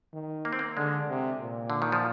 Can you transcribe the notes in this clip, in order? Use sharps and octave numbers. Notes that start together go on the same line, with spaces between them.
D#3
A#3
C4
A#3
D3 G#3
C3
A#2
D3
D#3
F3